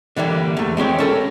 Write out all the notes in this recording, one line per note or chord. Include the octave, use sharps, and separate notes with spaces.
D3 E3 G3 A#3
E2 A3
G#3 C4 G4 C#5
C#4 A4 A#4